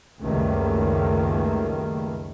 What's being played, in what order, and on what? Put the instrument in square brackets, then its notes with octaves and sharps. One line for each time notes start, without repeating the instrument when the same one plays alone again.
[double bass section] C#2 F#2 D#3 G3 A3 A#3